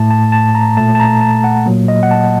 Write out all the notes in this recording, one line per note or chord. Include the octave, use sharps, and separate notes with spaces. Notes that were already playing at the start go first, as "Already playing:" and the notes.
Already playing: A2 A3 A5
A5
A5
A#5
A#2 A3 A5
A5
A#5
A5
F#5
A#2 F#3 A#3
D#5
F#5
A5